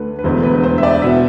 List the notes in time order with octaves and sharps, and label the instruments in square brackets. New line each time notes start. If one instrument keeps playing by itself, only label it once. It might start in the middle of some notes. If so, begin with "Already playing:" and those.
Already playing: [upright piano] D2 D3 A3 B4
B4
E1 E2 D3 C5
B4
C5
E5
D5
B2 B3 E5